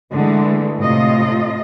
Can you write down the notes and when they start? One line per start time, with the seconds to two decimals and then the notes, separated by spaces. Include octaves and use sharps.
0.12 D3 E3 G#3 A3
0.77 A2 C3 F4 D#5